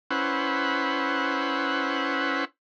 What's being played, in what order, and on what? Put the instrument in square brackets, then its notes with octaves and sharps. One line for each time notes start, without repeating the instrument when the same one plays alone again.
[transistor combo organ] C#4 E4 B4 C5 F#5